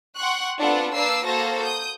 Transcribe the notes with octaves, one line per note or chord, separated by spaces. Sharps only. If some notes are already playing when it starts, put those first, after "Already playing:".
F#5 G5 C6 C#6 F#6
B3 C4 D4 F4 A4 F#5
A#3 D4 B4 D6 E6 C7
A#3 F#4 A4 C5 A5 A#6
D#6 G6